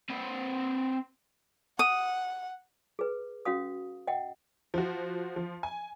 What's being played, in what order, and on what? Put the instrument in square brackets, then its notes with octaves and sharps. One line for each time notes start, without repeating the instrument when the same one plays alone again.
[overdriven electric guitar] C4 B4
[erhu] F#5 [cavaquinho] D#6
[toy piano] G#4 B4
C#4 F#4 F5 D#6
D#5 F#5 G5
[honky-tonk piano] F3 F#4
F3
G#5